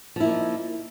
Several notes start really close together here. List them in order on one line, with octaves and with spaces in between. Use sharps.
F3 E4 A#3 D#4